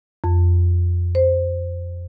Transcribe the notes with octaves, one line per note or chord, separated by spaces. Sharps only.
F2
C5